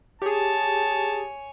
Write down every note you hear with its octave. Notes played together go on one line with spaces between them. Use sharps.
G4 G#4 C#5 G#5 A5